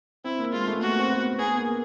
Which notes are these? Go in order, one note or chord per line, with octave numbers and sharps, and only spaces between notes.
C4 E4
A#3
G#3 F4
A3
B3
A#3 F#4
C4
B3
B3 G#4
A#3